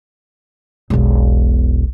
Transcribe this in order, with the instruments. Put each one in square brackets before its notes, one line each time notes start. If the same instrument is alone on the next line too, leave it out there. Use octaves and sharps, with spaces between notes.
[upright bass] E1 B1